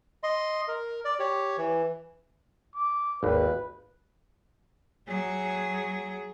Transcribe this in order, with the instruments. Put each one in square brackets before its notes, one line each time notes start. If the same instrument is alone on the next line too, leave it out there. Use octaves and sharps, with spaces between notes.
[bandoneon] D#5 C6
A#4
D5
G4 C#5
E3
[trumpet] D6
[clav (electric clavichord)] G#1 D#2 [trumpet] B4
[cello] F#3 G#4